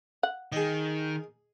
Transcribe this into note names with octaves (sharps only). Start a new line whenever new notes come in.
F#5
D#3 G#4 D#5